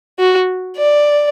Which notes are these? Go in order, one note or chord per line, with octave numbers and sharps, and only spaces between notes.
F#4
D5